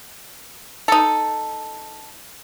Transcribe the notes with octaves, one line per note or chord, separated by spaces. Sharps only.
D#4 A4